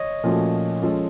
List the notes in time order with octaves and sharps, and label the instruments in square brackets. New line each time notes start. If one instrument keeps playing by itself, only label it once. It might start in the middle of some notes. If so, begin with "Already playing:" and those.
Already playing: [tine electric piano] C#5 D#5
[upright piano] A#2 F3 A3 C#4 F#4
F3 G#3 C#4 F4 A4